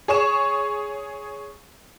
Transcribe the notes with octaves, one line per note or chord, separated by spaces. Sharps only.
G#4 C#5 C#6 E7